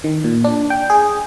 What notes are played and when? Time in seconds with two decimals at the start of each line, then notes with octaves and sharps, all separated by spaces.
0.04 D#3
0.24 A#2
0.44 D4
0.70 G5
0.90 G#4